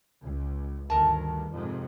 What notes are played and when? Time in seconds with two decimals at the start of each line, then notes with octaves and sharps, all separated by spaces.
0.21 C#2
0.90 D2 G2 D#3 A#4 A5
1.52 F2 G#2 C3